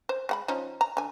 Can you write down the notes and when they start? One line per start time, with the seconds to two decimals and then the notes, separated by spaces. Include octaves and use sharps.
0.09 C5
0.29 G#3 F#5 B5
0.48 F3 C#4 D#4
0.81 A#5
0.97 D3 G#5